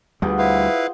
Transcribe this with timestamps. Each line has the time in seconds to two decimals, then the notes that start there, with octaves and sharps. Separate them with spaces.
0.22 D2 G3 B3 F4 G#4
0.39 E4 B4 C5 F5